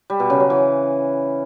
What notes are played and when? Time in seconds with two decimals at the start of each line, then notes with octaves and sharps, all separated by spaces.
0.10 G3
0.20 B2
0.30 C#3
0.40 F#3
0.50 E3